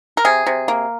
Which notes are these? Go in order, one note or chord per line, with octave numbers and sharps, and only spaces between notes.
A#4
C3 G#4
C3
A#3